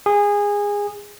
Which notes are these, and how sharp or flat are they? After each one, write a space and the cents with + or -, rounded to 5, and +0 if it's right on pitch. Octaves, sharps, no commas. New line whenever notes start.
G#4 -20